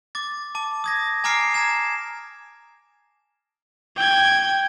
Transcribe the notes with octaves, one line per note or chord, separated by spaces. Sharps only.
D6 A6
A5 D6
D#6 G#6 A#6
G#5 A#5 D6 F6 C7 D7
A#5 G#6 E7
G5 G#6